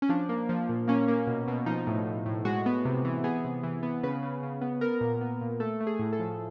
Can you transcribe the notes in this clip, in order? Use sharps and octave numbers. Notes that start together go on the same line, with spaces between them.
C#4
F3 D4
A#3
F3
A#2
A#3 C#4
A#3
B2
B2
F3 D#4
A2
A2
A2
G#3 F#4
B3
C3
E3
B3 G#4
C3
E3
B3
C#3 B4
C#3
C#3
B3
B3 A#4
A#2
B3
A#2
A3 A4
A3
G#4
A2
A4
F3